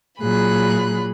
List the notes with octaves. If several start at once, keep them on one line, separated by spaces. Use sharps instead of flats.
A#2 F#3 G#4 B5 F#6